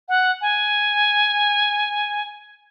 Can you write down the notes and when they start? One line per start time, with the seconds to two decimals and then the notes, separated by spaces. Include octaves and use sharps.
0.09 F#5
0.41 G#5